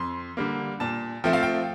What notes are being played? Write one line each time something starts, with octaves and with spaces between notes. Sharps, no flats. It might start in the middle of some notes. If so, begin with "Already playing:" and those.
Already playing: F2 C6
D3 G3 A#3
A#2 A5
F3 A3 C4 G5
F5
G5